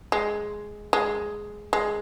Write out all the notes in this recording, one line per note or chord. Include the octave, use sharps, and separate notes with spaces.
G#3
G#3
G#3